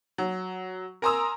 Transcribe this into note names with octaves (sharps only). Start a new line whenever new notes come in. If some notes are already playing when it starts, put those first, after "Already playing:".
F#3
A#4 G#5 A#5 C6 D#6 E6